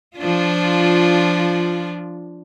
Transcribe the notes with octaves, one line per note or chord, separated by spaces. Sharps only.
F3 D4 F4